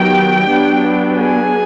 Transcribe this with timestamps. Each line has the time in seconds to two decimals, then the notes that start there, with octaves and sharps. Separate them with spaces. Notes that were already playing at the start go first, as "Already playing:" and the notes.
Already playing: D#3 F#3 B3 G4 G5
0.48 F#3 B3 D4
1.18 G#4 G#5